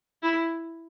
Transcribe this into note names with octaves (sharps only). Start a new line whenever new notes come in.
E4